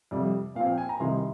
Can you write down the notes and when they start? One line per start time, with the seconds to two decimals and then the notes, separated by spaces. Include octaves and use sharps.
0.11 F2 C3 G3 D5
0.55 A#2 F3 C4 F5
0.68 G5
0.78 G#5
0.89 A#5
1.00 C2 C3 D#3 C6